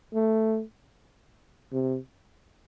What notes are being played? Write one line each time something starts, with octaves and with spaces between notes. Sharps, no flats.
A3
C3